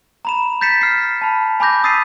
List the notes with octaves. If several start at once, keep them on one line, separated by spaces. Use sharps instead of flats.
A#5 B5 E7
G6 A6 B6 C#7 E7
F6 C7
A5 B5
G#5 B5 D6 G6 A#6
D#6 E6 A6 B6 C7 D#7